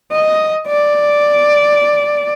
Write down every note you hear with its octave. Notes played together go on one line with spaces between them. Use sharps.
D#5
D5